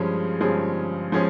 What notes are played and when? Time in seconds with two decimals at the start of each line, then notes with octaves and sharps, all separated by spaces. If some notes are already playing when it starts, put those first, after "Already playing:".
Already playing: G2 F3 G#3 C#4 G#4
0.41 G2 F3 G#3 C#4 G#4
1.12 F3 G#3 C#4 G#4